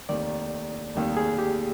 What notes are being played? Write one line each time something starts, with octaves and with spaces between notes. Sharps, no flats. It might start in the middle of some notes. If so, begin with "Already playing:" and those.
F1 D#2 D#3 D5
F1 D#2 D#3
G#4
G4